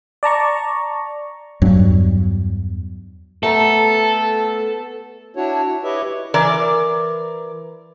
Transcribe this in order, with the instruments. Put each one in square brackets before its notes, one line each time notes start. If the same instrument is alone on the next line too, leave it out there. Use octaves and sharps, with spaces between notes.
[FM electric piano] D5 A5 A#5 C#6
[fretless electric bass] E2 G2 F#3
[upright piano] A3 [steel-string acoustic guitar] B3 A#5 [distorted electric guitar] A4
[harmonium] D4 E4 F#4 C#5
E4
E4 G4 B4 C#5 D#5 E5
[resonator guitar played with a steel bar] E3 A#4 D5